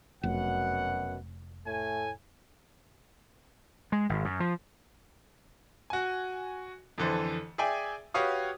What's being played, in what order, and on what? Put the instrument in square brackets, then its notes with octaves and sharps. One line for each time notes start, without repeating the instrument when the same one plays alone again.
[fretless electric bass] F1 [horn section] F#2 B2 F#5
[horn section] A2 A3 G#5
[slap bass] G#3
G#1
F#2
F3
[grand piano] F#4 G#5
F2 D3 E3 A4 C5
G#4 D5 E5 G5 G#5
F#4 G4 B4 C#5 F5 D#6